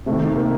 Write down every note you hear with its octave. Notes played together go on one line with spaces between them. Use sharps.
C3 A3
D#3
A3
A#3